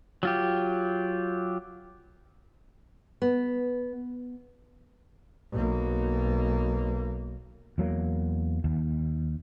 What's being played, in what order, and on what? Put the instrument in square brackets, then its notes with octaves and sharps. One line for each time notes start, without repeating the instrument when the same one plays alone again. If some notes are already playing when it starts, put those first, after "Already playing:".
[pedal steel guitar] F#3 F4 G4
[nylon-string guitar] B3
[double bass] B1 A#3
[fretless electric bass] E2 F#3 A#3
D#2